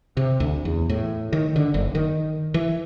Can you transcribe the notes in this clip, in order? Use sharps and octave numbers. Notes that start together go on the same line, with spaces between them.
C3
D2
E2
A2
D#3
D3
F#1
D#3
E3